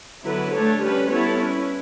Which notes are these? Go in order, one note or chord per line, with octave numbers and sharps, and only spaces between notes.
D3 F#3 B3 E4 B4
A3 D4 A4 C#5
G3 C#4 G4 B4
G3 B3 E4 A4 C#5
C#4 E4 B4